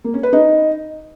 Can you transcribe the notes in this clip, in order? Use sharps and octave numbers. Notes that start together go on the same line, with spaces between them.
A#3
C#4
B4
D#4